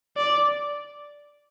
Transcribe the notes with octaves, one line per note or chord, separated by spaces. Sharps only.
D5